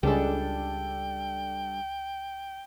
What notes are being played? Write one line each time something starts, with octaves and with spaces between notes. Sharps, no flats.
C#2 C#3 G3 G#3 D4 G#4 A4 G5